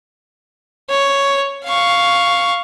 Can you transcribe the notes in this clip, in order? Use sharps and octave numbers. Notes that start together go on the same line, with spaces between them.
C#5
F5 C#6